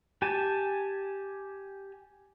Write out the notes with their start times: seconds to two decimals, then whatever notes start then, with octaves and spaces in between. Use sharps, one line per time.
0.22 G4 G#5 A5